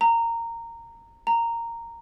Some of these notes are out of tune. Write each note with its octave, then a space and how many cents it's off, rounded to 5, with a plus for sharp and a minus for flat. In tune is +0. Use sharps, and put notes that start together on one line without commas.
A#5 -15
A#5 -10